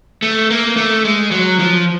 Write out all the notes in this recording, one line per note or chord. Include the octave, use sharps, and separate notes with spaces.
A3
A#3
A3
G#3
F#3
F3